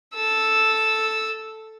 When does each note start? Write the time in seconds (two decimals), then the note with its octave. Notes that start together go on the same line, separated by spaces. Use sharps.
0.14 A4 E6